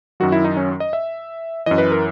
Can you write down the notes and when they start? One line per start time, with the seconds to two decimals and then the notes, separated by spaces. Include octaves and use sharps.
0.20 F#2 D#3 F#3 F#4
0.32 E4
0.44 D#4
0.57 C#4
0.80 D#5
0.93 E5
1.66 F#2 E3 D#5
1.78 B4
1.92 A#4